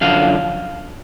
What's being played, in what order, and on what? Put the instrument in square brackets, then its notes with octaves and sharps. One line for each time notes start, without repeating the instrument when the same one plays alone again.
[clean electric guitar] F#2 D3 F3 D4 F5